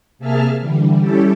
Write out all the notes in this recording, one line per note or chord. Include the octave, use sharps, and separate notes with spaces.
C3 A#3 G#4 E5 A5 F6
D3 E3 G3
G3 C#4 E4 G4 A4